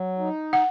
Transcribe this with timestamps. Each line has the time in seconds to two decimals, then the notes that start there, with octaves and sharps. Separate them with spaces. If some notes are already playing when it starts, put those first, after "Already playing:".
Already playing: F#3
0.19 D#4
0.53 F#5